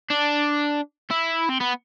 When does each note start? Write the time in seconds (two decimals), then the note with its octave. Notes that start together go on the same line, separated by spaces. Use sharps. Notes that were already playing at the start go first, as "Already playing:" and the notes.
0.10 D4
1.11 E4
1.49 C4
1.60 B3